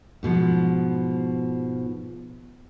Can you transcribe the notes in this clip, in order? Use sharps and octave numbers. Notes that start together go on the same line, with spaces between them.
G#2 B2 D3 F3